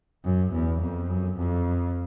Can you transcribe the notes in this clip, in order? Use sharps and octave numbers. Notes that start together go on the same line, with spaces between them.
F#2
E2
F2
F#2
F2